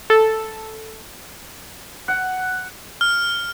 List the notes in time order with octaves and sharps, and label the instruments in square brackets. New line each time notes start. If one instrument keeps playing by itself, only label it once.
[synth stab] A4
[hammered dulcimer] F#5
[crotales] F6